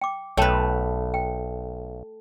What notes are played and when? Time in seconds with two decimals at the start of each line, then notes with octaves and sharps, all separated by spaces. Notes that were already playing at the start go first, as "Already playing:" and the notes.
0.01 G5 D6
0.37 B1 A3 B4 C#5 G5 A5
1.14 G5